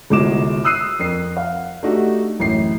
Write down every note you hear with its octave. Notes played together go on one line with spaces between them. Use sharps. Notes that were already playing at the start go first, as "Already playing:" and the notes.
G1 C2 G#3 F#4 D6 E7
D#6 E6 F#6 C7 D#7
F2 A#4 C7
F5 F#5
A3 D4 D#4 F#4 G4
A1 F#2 C7